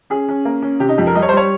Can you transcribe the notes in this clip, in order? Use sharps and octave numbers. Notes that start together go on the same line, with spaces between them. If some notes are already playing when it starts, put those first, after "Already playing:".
C#4 G#4
C#4
A#3
C#4
C3 G4
D#4
F2 G4
A#4
G3 D#5
C#5
C5
G3 C#5